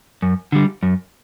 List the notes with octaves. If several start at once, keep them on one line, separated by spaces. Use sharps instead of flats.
F#2
D3 G3
F#2